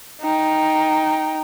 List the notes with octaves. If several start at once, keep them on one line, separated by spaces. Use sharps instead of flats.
D#4 G5